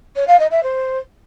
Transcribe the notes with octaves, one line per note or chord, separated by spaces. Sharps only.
C#5
F5
D#5
E5
C5